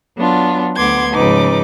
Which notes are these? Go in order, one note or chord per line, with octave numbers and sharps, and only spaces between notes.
F#3 B3 D4 F4
D2 B3 F#5 C6 D6 G#6
G#2 C#3 F3 D#4 B4 D6